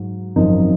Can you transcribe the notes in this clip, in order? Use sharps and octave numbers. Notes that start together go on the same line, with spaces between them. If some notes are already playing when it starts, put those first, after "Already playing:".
Already playing: G#2 F#3
G#1 F#2 F3 C4 D#4